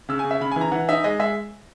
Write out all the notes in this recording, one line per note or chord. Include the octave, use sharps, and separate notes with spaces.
C#3 E6
G#5
C#3
E5
C#3 B5
G#5
E3
A#5
E3 F#5
D#4 E5
G#3 D#5
G#3 E5